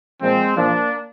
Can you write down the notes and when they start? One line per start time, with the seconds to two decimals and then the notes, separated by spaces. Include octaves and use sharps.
0.22 A#2 F3 G#3 C4
0.56 A#2 F3 A#3 D4